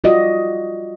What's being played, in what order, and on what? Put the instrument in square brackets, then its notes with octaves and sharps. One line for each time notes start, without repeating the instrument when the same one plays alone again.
[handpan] G3 F4 F#4 D5 D#5